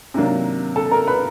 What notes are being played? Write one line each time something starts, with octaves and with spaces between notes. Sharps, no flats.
C3 D#3 F#3 A#3 D4
A4 A5
A#4 A#5
B4 B5